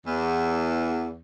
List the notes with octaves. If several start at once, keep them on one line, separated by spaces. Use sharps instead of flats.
E2